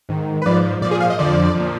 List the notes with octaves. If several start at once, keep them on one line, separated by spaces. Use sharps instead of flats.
G#2 D#3
B4
G#2 F3 D5
A#2 F3 D5
G#4
F5
D#5
F2 D3 F3 D5
A#2 F3